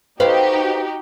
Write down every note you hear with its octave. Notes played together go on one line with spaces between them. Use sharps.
D#4 F#4 G4 B4 C5 F5